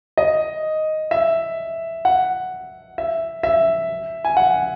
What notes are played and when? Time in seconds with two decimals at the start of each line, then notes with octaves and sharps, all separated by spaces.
0.17 D#5
1.11 E5
2.05 F#5
2.98 E5
3.43 E5
4.25 G#5
4.37 F#5